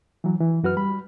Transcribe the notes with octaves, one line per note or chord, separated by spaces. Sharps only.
E3 F#3
E3
F#2 F#4 B4 F6
G3 B5